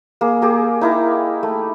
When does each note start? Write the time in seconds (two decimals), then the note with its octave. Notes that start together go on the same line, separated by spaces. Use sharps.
0.21 A#3 G#4
0.42 G4 G#4 A#4
0.81 D#4 E4 A#4
1.43 A3